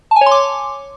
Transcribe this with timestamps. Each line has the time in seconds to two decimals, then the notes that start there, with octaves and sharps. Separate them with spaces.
0.11 A5
0.16 G#5
0.21 C#5
0.26 C6
0.31 D6